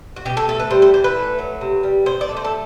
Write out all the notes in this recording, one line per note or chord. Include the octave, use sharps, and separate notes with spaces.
F#4
B2 G4
A4
A3 A4
B4
G3 C5
C5
E3 C5
B4
A3
F#3
C3
G3
B2 C5
D5
A3
C5
A4